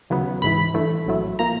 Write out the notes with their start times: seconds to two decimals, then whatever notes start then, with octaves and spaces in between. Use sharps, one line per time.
0.10 D#2 C#3 F#3 B3
0.42 G#1 G#2 E3 B5
0.74 G2 E3 A3
1.06 A#1 A2 F#3 A3
1.39 A#2 F3 A#3 A#5